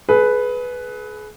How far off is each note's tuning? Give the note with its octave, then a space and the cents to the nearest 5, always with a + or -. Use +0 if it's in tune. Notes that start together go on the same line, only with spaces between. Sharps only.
G#4 +35 B4 +0